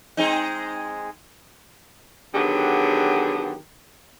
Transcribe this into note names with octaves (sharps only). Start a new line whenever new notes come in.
G#3 C4 D#4
D3 D#3 F#3 B3 G4 G#4